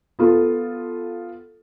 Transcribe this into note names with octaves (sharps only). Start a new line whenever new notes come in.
B3 F4 A4